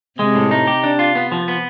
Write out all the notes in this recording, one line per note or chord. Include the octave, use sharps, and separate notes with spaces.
C3 G#3
A2
D#4
G4
D4
F4
B3
F3
B3